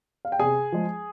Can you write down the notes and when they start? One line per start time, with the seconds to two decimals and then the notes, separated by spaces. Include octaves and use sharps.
0.25 F5
0.32 G5
0.39 C3 G#4 G#5
0.72 F3 G#3